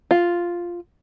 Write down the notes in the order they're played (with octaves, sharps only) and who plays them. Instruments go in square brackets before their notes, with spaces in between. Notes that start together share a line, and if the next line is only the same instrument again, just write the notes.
[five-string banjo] F4